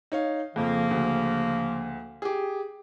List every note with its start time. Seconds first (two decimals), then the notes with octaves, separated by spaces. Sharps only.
0.12 D#4 C#5 F5
0.56 F2 C#3 F3 A#3
0.91 D2
2.22 G4 G#4